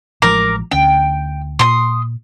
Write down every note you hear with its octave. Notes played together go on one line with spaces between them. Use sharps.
A1 F3 G#3 A#4 D6
D2 C#4 G5
A#2 C6 D#6